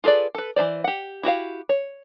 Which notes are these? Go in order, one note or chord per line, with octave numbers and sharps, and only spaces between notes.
F4 G#4 A4 B4 D5
A4 B4
E3 A#3 C5 D5
G4 F#5
E4 F#4 G4 F5
C#5